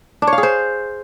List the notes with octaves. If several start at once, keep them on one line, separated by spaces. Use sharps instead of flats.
D4
C#5
F5
G#4
C5